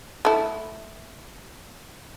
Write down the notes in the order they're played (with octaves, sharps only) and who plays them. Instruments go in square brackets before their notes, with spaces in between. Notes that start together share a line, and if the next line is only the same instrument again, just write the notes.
[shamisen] A3 E4